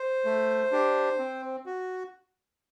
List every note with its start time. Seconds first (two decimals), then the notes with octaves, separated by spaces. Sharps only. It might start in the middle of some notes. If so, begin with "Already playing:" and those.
Already playing: C5
0.25 A3
0.72 D4 G4
1.19 C4
1.66 F#4